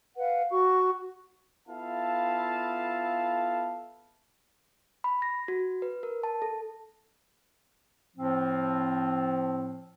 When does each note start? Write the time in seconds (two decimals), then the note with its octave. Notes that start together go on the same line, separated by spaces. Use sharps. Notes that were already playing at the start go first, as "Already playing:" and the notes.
0.17 B4 F5 F#5
0.51 F#4 C#6
1.68 B3 E4 F4 A4 F5 A5
5.04 B5
5.22 A#6
5.48 F#4
5.82 B4
6.03 A#4
6.23 A5
6.42 A4
8.17 A2 F3 C4